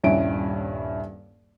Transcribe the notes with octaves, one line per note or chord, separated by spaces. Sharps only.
D#1 G2 C#4 E4 D7